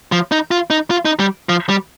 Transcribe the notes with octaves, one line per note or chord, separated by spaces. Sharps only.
F3
D#4
F4
D#4
F4
D#4
G3
F3
G3